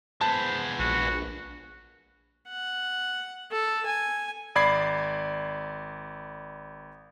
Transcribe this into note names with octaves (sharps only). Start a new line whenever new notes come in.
G#3 B3 C5 A5
A#1 F#4
F#5
A4
G#5
G#1 D5 B5 G#6 C7